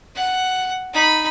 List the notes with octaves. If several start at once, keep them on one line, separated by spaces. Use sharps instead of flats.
F#5
D#4 B5